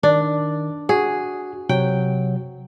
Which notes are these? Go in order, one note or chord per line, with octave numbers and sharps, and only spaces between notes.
D#3 D4
F#4 G#4
C3 F#3 G5